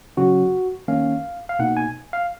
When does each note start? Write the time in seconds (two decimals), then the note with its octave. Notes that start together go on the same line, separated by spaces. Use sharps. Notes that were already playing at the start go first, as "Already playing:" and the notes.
0.17 C#3 F#3 C#4 F#4
0.88 D#3 A#3 C#4 F5
1.49 F5
1.59 B2 A#3 D#4 F#5
1.77 G#5
2.13 F5